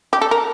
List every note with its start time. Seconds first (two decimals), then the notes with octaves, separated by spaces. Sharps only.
0.13 G4
0.21 A4
0.31 A#4